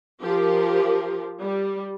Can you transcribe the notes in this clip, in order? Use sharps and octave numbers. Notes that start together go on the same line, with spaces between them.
F3 G4 A#4
G3